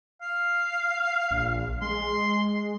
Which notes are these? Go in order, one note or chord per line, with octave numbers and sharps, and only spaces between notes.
F5
A#1
G#3 C6